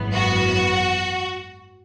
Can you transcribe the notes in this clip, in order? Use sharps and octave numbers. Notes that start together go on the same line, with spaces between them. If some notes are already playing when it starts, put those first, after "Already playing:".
Already playing: G#1 F#2 E3 B3
F#4